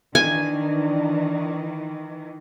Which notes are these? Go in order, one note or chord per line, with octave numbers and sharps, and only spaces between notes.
D#3 E3 D4 G#5